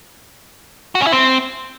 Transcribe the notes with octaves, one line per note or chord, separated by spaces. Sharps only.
F#4
C#4
E4
C4